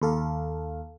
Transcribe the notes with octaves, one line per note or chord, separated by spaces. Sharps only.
D#2 A4 F5